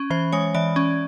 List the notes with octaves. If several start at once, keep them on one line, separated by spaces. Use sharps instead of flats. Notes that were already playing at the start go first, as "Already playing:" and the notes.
Already playing: C#4
E3 C5
G#3 C#5
E3 D5
C#4